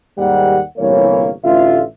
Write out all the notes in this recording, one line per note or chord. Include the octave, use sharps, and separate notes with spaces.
D#2 G#2 G3 F#5
G1 C2 A#2 E3 A#3 C#5
A1 D3 F4 E5